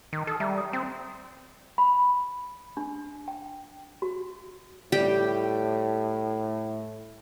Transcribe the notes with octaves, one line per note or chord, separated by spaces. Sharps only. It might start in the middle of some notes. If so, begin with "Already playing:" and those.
D#3
A4 D#6 F6
G3 E5 A#5
A#5 D#6
C4 G5
B5
D4
G5
F#4
A2 G3 G4 G5